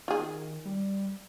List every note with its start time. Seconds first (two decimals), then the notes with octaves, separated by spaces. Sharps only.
0.08 D#3 F4 G#4
0.65 G3